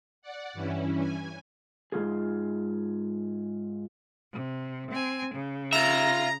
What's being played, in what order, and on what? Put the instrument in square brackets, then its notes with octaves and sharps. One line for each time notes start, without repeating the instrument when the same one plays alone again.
[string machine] D5 F#5
G2 E3 C#4 E4
G#5
[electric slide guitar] G#2 F3 F4 G#4
[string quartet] C3
C4 G#5
C#3
[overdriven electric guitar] F4 E5 [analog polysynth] A#5